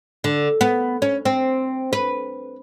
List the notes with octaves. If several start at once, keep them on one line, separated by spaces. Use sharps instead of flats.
D3
B3
C#4
C4
B4